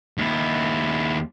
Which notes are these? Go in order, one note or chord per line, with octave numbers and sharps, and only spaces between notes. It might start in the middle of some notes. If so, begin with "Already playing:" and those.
D#2 E4